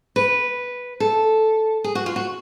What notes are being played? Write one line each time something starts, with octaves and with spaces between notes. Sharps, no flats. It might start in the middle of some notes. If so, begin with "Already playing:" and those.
B4
A4
G#4
F#4
F4
F#4